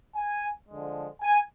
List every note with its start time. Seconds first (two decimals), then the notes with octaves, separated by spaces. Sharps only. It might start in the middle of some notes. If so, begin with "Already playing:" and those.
0.15 G#5
0.69 D3 F3 G#3
1.22 G#5